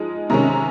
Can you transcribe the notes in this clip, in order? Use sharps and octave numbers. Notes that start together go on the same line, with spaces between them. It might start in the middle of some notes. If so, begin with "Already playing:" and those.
Already playing: F3 G#3 D#4
C3 D#3 G#3 C#4 A#5